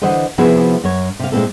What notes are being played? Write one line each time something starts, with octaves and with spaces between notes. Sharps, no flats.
D3 E3 C5 D#5 E5 F#5
C3 F3 B3 E4 F#4 G#4
F#2 C#5
C3 F5
A#2 G#3 A3 C4 E4 A4